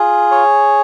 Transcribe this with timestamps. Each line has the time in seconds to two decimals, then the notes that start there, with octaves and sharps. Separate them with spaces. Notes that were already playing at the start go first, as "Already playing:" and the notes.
Already playing: F4 G#4
0.31 C#5